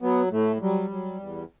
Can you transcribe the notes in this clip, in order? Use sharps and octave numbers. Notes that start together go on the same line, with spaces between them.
F#3 B3
A2 A3
F#3 G3
F#3
E2